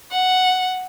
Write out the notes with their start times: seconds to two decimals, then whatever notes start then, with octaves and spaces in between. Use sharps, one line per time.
0.12 F#5